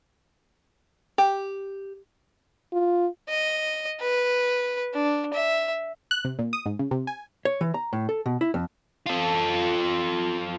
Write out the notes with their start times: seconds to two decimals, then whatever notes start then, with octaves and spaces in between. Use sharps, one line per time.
1.18 G4
2.73 F4
3.29 D#5
4.01 B4
4.94 D4
5.34 E5
6.11 F#6
6.25 C3
6.39 A#2
6.53 D#6
6.66 G#2
6.79 C#3
6.91 C3
7.07 G#5
7.45 C#5
7.61 E3
7.74 A#5
7.93 A2
8.09 A4
8.26 B2
8.41 E4
8.54 F2
9.07 F4 A4